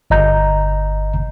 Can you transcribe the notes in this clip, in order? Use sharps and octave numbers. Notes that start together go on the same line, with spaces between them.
G1 D#5 A#5 G6